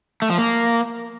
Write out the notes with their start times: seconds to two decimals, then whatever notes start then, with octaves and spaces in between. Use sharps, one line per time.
0.22 A3
0.30 F3
0.38 A#3